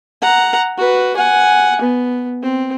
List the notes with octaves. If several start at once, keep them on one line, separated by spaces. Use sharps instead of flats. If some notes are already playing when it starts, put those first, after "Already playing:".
F#5 A#5
F#4 B4
F#5 G#5
B3
C4